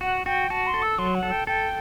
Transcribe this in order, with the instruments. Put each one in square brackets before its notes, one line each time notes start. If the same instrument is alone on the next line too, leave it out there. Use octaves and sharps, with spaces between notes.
[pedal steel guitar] F#4 [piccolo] F#5
[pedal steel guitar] F#4 [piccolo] G5
[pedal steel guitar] F#4 [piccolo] A5
[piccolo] C6
[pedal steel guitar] A4
[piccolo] E6
[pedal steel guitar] F#3 [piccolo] C6
[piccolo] F#5
[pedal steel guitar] A4
[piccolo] G5
[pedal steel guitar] A4 [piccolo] G5